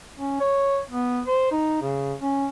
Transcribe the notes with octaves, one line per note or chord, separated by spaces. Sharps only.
C#4
C#5
B3
C5
D#4
C#3
C#4